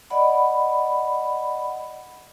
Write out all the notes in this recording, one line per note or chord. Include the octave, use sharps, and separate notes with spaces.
D5 D#5 F#5 B5